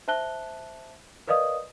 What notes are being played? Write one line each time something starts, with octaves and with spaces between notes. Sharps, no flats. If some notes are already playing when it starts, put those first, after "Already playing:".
C5 E5 A5 F#6 G7
A#4 B4 D5 D#5 F5 D#6